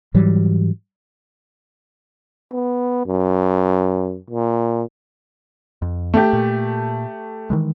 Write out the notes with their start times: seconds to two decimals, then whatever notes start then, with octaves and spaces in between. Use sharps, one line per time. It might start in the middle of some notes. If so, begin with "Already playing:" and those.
0.14 G#2 E3 F#3 G3
2.53 B3
3.06 F#2
4.31 A#2
5.82 F2
6.14 A3 G4
6.33 A#2
7.50 D#3 E3 G#3